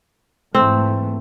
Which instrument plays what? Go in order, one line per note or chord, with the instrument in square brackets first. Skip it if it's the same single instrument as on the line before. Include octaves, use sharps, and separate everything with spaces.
[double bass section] G#2 E3 A3 [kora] C4